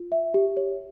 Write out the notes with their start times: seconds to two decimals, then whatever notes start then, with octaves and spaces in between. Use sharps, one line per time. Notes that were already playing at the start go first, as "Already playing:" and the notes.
Already playing: F4
0.12 E5
0.34 G4
0.57 C#5